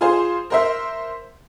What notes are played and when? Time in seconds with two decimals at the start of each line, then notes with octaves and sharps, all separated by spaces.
0.01 F4 G#4 C5
0.50 A#4 C5 E5